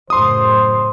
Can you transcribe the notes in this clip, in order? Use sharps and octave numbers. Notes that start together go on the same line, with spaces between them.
F#2 A2 C#3 C5 C6 D#6